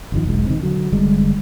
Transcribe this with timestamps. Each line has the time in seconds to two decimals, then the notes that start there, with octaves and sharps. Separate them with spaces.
0.12 G1 E2 D#3 F3
0.25 E1 B1 G#3
0.47 C3 D#3
0.59 D3 F#3
0.92 F1 D3 G3 G#3